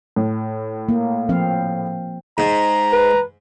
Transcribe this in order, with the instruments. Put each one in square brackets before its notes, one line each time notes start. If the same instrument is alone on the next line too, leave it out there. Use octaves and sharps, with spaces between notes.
[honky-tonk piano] A2
[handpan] A#3
F3 C4 F5
[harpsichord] G#2 [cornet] A#5
[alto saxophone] B4